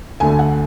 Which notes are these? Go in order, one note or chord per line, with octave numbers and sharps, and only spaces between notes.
D2 D3 A3 G#5
F#5